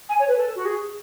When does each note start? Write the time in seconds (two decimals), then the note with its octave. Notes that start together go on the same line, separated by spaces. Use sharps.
0.09 G#5
0.19 C#5
0.27 B4
0.37 A4
0.55 F#4
0.65 G#4